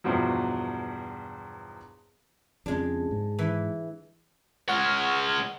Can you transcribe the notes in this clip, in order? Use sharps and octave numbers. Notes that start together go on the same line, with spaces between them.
E2 G2 B2 F3 F#3
F2 C#3 G#3 D4
G#2
E3
G#3 C#5 F#5 F6